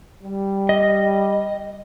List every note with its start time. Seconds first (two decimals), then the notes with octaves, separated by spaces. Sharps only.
0.24 G3
0.69 D#5